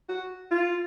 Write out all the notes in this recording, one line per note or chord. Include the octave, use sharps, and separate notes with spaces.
F#4
F4